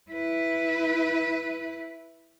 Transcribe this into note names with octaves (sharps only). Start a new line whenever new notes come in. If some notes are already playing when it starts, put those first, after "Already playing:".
E4 B4